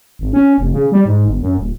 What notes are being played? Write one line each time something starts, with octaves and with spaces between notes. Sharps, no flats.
G#1
C#4
F1
C#3
G3
G#2
G1
F#2
D#1